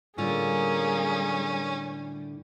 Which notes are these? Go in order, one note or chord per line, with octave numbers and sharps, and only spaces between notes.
A2 D3 G3 A#3 C#4 F4 G#4